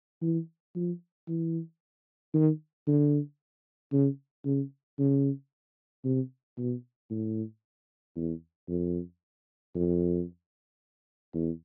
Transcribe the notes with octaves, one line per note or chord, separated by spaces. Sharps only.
E3
F3
E3
D#3
D3
C#3
C#3
C#3
C3
B2
A2
E2
F2
F2
E2